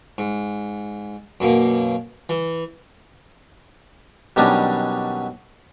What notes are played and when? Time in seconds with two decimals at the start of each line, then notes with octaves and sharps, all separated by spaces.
0.18 G#2
1.40 F#2 B2 A#3
2.29 E3
4.36 B2 D#3 F#3 G3 C#4 D4